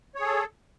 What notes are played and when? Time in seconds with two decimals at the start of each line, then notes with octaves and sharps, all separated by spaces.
0.15 C#5
0.20 G#4
0.25 A4